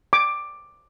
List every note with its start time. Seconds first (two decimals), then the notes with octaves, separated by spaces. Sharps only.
0.13 D6